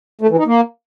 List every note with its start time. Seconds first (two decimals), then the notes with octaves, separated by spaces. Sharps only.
0.21 A3
0.30 E3
0.38 D#4
0.47 A#3